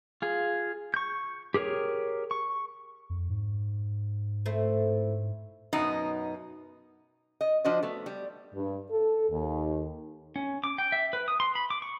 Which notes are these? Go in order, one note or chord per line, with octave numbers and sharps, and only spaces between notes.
F4 G#4
C#6 G6
G4 G#4 A#4 C#5
C#6
F2
G#2
A2 A3 C4
F#2 B2 D#4
D#5
F3 D4 F#4 C5 D#5
A3 B3
G3
G2
A4
D#2
C#4
D6
G5
E5
B4
D#6
C6
B5
D6
C#6